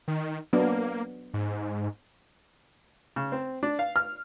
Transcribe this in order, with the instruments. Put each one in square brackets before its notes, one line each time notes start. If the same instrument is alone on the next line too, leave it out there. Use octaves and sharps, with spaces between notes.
[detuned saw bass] D#3
[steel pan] F#3 B3 D4 [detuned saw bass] A#3
[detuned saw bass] G#2
[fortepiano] C#3
C4
D4
F5
F6